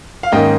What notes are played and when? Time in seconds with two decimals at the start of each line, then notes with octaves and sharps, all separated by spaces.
0.23 F5
0.32 G#2 D#3 A#3 C#4 D#5 G5